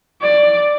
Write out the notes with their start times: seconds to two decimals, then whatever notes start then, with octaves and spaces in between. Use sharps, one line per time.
0.22 D5